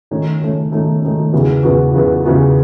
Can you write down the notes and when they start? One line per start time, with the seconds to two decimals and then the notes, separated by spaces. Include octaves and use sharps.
0.11 D#3 A3 C#4
0.42 D#3 A3 C#4
0.72 D#3 A3 C#4
1.02 D#3 A3 C#4
1.32 E2 C#3 E3 B3 F#4
1.63 E2 C#3 E3 B3 F#4
1.94 E2 C#3 E3 B3 F#4
2.25 E2 C#3 E3 B3 F#4